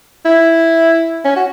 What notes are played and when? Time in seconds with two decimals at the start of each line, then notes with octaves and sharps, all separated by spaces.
0.25 E4
1.25 C#4
1.36 F#4